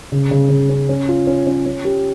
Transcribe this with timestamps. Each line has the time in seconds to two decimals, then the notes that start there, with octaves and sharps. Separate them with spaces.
0.12 C#3
0.31 C#3
0.50 C#3
0.69 C#4
0.89 C#4
1.08 F4
1.27 C#4
1.47 C#4
1.66 C#4
1.85 G4